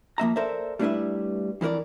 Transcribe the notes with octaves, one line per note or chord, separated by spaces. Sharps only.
F3 A#3 E5 A#5
A4 A#4 C5 D5 E5
G3 A3 D4 E4 B4 E5
F2 E3 D4 A#4 D5